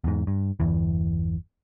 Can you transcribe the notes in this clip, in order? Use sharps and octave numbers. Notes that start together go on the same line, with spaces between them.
E2 G#2
G2
G1 E2 E3